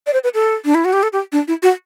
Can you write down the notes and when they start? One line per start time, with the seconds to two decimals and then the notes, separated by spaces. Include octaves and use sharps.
0.07 D5
0.13 C5
0.24 B4
0.34 A4
0.65 D4
0.75 E4
0.85 F#4
0.93 G4
1.03 A4
1.13 G4
1.32 D4
1.48 E4
1.63 F#4